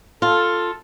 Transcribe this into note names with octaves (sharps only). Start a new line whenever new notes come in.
F4 A4